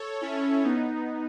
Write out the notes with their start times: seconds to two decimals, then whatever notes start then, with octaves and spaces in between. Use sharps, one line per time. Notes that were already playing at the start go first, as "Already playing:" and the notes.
Already playing: A4 C#5
0.21 C#4 E4
0.64 B3 D#4